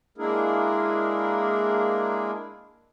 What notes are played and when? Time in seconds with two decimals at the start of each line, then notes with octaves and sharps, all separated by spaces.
0.18 G#3 A#3 D4 E4 G#4 A#4